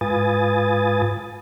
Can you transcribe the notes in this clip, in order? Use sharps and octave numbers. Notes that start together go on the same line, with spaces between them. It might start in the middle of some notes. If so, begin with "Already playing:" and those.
G#2 F4 B4 G#5 D#6 A6